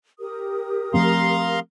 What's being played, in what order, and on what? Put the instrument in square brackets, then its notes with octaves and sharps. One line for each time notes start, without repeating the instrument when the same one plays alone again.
[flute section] G4 A#4 D#6
[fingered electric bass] F3 A3 C4 [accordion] F5 A#5 C6